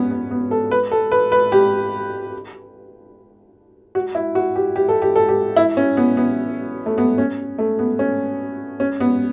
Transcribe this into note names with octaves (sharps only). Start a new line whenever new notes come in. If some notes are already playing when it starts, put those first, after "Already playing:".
Already playing: B3 C#4
B3
B3
A4
B4
A4
B4
B4
G4
F#4
E4
F#4
G4
G4
A4
G4
A4
G4
E4
C#4
B3
B3
A3
B3
C#4
A3
B3
C#4
C#4
B3